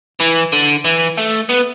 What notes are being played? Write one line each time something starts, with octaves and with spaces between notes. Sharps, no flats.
E3
D3
E3
A3
B3